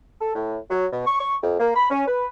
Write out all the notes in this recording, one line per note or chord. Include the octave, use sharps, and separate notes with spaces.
A4
A2
F#3
B2
C#6
C#6
F2
A#3
B5
C#4
B4